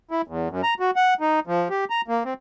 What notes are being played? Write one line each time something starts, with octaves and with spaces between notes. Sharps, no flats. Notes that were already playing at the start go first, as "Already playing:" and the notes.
E4
E2
F#2
A#5
F#4
F#5
D#4
F3
G4
A#5
A#3
C4